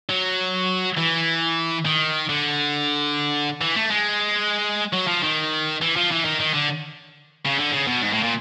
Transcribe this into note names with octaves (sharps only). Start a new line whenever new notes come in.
F#3
E3
D#3
D3
E3
A3
G#3
F#3
F3
D#3
E3
F3
E3
D#3
D#3
D3
C#3
D3
C#3
B2
G#2
A2
A#2